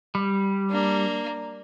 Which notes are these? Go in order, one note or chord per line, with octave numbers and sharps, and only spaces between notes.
G3
A#3 D4